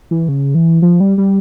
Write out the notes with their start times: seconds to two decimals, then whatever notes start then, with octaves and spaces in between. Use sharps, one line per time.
0.11 E3
0.28 C#3
0.55 E3
0.82 F3
1.00 G3
1.18 G3